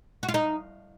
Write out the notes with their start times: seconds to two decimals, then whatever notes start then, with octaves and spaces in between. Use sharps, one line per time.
0.23 F#4
0.29 F4
0.34 D#4